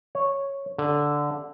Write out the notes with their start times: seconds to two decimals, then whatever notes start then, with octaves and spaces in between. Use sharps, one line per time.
0.15 C#5
0.78 D3